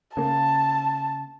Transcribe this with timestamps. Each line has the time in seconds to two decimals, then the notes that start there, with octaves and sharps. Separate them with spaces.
0.17 C#3 A#3 A5